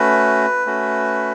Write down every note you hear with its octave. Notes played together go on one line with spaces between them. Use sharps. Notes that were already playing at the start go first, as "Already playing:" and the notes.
Already playing: A3 C#4 F#4 B4
A3 C#4 F#4